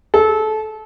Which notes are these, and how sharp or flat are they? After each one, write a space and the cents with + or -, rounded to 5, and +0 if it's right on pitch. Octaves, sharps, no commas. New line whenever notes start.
A4 -25